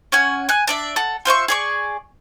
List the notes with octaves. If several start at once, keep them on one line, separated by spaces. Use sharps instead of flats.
C#4 F#5 G#5
G#5 F#6
D4 D5 E5
A4 F#5
F4 C5 E5 C#6
G#4 D5 C#6